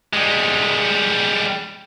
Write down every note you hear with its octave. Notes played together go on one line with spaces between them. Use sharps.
G3 G#3